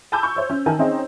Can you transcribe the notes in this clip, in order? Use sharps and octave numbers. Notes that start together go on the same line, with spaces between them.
G#5 A5 B5 D6 E6 G6
C#6
C5 C#5
C#4
D#3 A#4 G#5 A5
C4 C#4 D#4 G#4 C#5